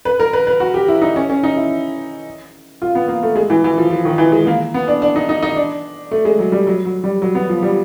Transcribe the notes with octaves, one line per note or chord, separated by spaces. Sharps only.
B4
A#4
B4
B4
F#4
G4
E4
D#4
C#4
C#4
D#4
E4
F4
B3
A#3
A3
G#3
E3
E3
F3
F3
D#3
E3
G#3
A#3
B3
D4
D4
D#4
D#4
D#4
D4
A3
G#3
F#3
G3
F#3
F#3
G3
F#3
B3
F3
G3